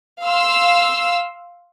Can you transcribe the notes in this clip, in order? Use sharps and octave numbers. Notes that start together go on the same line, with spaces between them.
F5 C6 E6